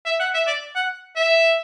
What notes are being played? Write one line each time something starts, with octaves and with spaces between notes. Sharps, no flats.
E5
F#5
E5
D5
F#5
E5